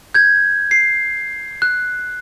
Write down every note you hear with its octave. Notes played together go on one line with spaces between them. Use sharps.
G6 G#6
C7
F#6